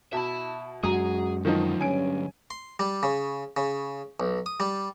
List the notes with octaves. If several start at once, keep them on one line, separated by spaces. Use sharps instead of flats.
B2 E5 A5 B5
F#2 G#3 F#4 G#4 A#5 D#6
D2 D#3 F3 F#3 D#4
G2 C#4 G#5 D7
C6
G3
C#3
C#3
B1
D#6
G3